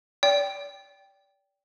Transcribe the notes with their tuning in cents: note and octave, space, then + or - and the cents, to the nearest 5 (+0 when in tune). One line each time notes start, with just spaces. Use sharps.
D5 -35 G5 +0